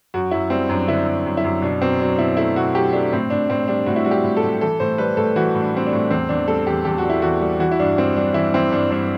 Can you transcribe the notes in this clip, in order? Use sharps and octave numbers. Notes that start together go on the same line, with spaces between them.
F#2 F#4
F#2 E4
G3 C4
F#2 D4
D3 E4
F#2
F#2
E4
F#2
B2 D4
B2 C4
F#3 D4
B2 E4
A3 E4
B2 F#4
F#3 G4
A3 D4
A2 C4
A2 D4
A2 C4
G3 D4
A2 F#4
E4
G3 F#4
G4
A2
A4
A2
E3 A4
A2 C5
G3 B4
A2 A4
E3 F#4
A2
D4
G3 C4
D4
A2
E2 C4
E2 D4
G3 A4
E2 G4
E2 G4
F#4
G3
E4
E2 F#4
G3
E3 F#4
E4
G2 D4
G2 C4
G3 D4
E3 E4
E3 C4
G2 D4
G2 D4